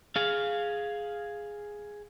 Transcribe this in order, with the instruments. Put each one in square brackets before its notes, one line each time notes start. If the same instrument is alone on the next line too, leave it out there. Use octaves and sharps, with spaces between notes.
[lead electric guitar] G#4 F5